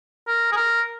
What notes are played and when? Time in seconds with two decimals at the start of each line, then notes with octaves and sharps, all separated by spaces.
0.27 A#4
0.52 G#4
0.56 A#4